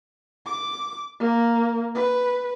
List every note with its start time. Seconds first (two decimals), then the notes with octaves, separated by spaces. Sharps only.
0.46 D6
1.19 A#3
1.95 B4